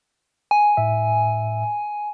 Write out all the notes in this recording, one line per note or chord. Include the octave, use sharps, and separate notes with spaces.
G#5
A2 E5